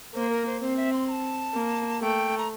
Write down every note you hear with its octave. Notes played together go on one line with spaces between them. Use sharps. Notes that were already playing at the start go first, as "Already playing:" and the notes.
A#3 C5
A#4
C5
C4 C5
E5
C6
A#5
A5
A#3
A3 G5
A#5